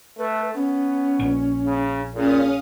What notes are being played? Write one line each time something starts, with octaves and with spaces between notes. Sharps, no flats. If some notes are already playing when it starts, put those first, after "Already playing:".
A3 B4
B3 C#4
A#1
C#3
A#2 C#4 G#4 F5 D#6